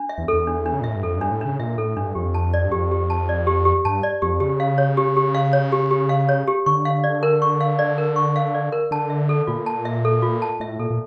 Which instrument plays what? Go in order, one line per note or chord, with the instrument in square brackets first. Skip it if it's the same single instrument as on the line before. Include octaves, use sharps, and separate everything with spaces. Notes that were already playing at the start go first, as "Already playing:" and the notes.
Already playing: [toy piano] D4
E5
[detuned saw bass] E2
[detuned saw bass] E2 [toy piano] A4
[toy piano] D4
D4
[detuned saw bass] C#3
A#2
[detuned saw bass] A2 [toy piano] E5
[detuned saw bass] G2
[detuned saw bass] F2 [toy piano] A4
[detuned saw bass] G2 [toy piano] D4
[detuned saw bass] A2
[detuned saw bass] C#3 [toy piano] D4
[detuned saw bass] A#2 [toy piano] E5
[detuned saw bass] A2 [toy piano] A4
[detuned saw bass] G2 [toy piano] D4
[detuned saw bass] F2 [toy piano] G4
[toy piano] A5
D5
[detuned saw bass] G2
[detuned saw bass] F2 [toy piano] G4
[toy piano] G4
A5
D5
G4
G4
[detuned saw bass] G2 [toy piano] A5
[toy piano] D5
[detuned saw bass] F2 [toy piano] G4
[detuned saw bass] C#3 [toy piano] G4
[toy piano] F5
C#5
G4
G4
F5
C#5
G4
G4
F5
C#5
G4
[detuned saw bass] D3 [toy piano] C#6
[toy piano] F5
D5
A#4
C#6
F5
D5
A#4
C#6
F5
D5
A#4
[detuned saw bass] D3 [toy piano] A5
[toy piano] E5
A4
[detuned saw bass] A#2 [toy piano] F4
[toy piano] A5
E5
A4
F4
A5
[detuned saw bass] A2 [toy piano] E5
[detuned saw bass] A#2 [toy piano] A4
[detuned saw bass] A#2